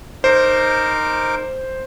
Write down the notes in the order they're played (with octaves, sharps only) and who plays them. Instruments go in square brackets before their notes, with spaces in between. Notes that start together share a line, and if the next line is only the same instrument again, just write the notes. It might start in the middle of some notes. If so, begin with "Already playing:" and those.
[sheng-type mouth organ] D#4 A#4 D6 [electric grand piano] C5